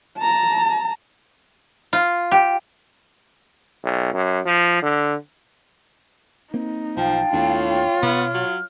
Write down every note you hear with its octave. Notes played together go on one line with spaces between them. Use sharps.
A5 A#5
F4
G4
B1
F#2
F3
D3
A#3 C4 D#4
B1 F3 F5 G5 A5
D#2 A2 B3 D4 F4 C#5
G5
B2 B3 F6
F#3